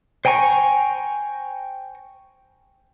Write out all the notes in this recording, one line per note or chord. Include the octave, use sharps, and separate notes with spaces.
C5 G5 G#5 A#5 C#6